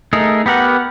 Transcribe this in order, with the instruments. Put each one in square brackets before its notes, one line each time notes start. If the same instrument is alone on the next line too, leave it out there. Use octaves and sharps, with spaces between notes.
[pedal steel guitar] A3 D#4 G#4 A#4
B3 G4 A#4 F#5